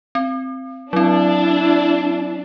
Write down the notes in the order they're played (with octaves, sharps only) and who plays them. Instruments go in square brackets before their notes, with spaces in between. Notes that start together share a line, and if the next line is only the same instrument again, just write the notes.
[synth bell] C4
[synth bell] F#3 C4 [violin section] D4 [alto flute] E4